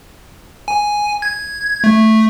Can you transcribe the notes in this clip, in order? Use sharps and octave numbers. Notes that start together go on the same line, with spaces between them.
G#5
G#6
A3